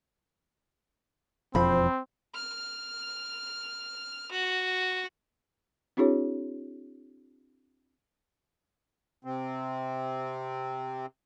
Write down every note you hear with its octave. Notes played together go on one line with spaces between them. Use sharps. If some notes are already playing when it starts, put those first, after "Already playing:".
E1 F2 F3 C4 C5 B5
F6
F#4
C4 D4 E4 F#4 G#4 C#5
C3 C4